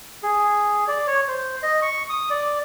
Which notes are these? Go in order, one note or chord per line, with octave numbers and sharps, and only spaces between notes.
G#4
D5
C#5
C5
D#5
C#6
D#6
D5